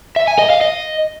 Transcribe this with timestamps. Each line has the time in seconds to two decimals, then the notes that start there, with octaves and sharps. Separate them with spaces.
0.16 E5
0.28 G#5
0.39 D#5
0.50 F5
0.61 D#5